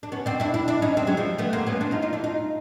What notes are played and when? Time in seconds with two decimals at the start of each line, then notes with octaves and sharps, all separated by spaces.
0.03 D4
0.12 B3 C#4
0.26 C4 D4
0.40 D4 E4
0.54 D4 E4
0.68 D4 E4
0.82 C#4 D#4
0.97 C4 D4
1.07 F#3 G#3
1.17 F3 G3
1.38 A3 B3
1.53 A#3 C4
1.66 B3 C#4
1.81 C4 D4
1.91 D#4 F4
2.02 D#4 F4
2.13 D4 E4
2.24 D#4 F4